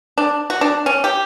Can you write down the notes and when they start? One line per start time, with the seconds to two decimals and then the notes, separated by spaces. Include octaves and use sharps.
0.18 D4
0.50 F#4
0.61 D4
0.86 C#4
1.04 G4